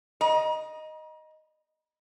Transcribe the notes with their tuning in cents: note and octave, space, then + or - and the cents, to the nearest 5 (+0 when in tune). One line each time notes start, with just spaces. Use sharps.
D#5 +0 A#5 +40